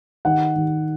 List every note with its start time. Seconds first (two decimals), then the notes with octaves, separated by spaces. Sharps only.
0.25 D#3 F#5
0.56 D#3